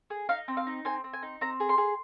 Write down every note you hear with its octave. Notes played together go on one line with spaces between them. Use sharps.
G#4
D#4 F5
C4
F5
D#4
C4 G#5
C4
G#5
D#4
C4 A#5
G#4
C6
G#4